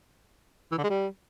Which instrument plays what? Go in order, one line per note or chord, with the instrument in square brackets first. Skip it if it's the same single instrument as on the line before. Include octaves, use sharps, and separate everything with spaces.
[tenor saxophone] E3
D3
G#3
G3